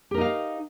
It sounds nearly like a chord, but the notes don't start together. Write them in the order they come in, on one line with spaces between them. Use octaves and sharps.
G4 A#4 D#4 F5